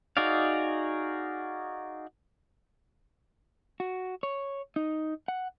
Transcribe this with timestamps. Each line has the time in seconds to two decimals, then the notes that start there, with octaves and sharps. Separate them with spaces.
0.17 D#4 F#4 G#4 D5 F5
3.80 F#4
4.23 C#5
4.76 D#4
5.28 F#5